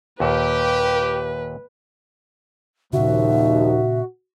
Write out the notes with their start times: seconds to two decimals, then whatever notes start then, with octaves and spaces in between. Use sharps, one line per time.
0.20 D#2 A#2 G4 B4
2.93 D#2 A#2 C#3 F3 D#4 F#4 E5